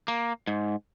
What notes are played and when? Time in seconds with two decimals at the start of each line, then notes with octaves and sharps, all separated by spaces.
0.08 A#3
0.47 G#2